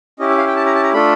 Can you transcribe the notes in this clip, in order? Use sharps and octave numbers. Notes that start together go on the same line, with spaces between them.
C#4 E4 G4 D#5
E5
F5
G5
A5
A#5
A5
A#5
A3 D4 F4 A4 B5